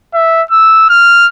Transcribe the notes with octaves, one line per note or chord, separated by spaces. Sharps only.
E5
E6
F6